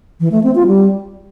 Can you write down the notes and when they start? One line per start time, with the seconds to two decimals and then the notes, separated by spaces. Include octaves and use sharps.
0.20 E3
0.32 A3
0.44 C4
0.55 F4
0.67 G3